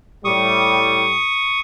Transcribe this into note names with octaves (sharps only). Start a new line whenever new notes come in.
A2 G3 C#6 D#6